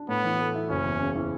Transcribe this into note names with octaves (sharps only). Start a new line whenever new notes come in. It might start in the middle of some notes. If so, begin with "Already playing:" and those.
Already playing: D4
A2 B3
E3
A3
E4
F#1 C#4
E2
C#3
E3